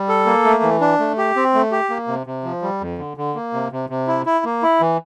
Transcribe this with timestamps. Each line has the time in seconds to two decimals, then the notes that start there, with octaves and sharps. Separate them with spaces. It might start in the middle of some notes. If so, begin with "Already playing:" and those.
Already playing: G3
0.09 A4
0.26 A#3
0.45 A3
0.63 E3
0.81 D4
0.99 A3
1.18 G4
1.36 C4
1.54 A3
1.72 G4
1.90 A#3
2.08 C3
2.27 C3
2.44 F3
2.62 G3
2.81 F2
2.98 D3
3.17 D3
3.35 A#3
3.53 C3
3.72 C3
3.90 C3
4.07 E4
4.26 E4
4.45 A#3
4.63 E4
4.81 E3